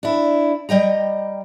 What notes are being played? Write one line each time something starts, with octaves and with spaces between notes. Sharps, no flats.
D4 E4
G3 D#5 G5 A#5